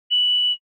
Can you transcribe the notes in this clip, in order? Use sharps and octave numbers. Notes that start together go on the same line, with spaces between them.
F#7